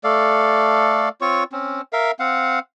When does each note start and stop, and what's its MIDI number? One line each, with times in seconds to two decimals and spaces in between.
0.04 1.09 57
0.04 1.09 69
0.04 1.09 74
0.04 1.09 77
1.21 1.44 60
1.21 1.44 65
1.21 1.44 73
1.21 1.44 85
1.52 1.81 60
1.52 1.81 61
1.93 2.11 70
1.93 2.11 76
1.93 2.11 77
2.20 2.59 60
2.20 2.59 77
2.20 2.59 78